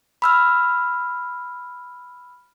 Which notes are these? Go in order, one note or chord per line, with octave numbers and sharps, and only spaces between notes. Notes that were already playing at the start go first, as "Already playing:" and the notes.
B5 E6 F6